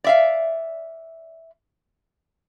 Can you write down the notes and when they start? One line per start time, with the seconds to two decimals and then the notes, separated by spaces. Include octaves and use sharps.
0.04 D5 E5 F5